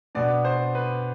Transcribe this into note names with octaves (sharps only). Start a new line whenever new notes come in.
B2 B3 D4 D5
C5
B4